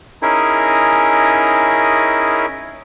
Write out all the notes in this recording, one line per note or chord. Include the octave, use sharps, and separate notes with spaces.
C#4 D#4 E4 G#4 A#4